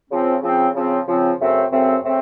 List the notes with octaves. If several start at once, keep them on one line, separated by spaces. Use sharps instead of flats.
C#3 F3 C4
C#3 F3 C4
C#3 F3 C4
C#3 F3 C4
F#2 C#3 A3 C4
F#2 C#3 A3 C4
C#3 A3 C4